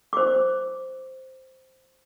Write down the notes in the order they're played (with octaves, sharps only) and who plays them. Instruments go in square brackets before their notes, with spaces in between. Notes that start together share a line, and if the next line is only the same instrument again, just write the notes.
[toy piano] C5 D6